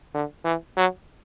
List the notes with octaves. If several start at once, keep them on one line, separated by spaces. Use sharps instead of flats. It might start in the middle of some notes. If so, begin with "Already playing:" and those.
D3
E3
F#3